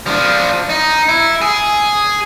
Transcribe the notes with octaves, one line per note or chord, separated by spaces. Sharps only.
F3 D4
D#4
E4
G#4